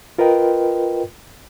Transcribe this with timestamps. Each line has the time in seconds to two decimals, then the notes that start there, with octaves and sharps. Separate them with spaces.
0.18 F4 A#4 B4 D#5 G5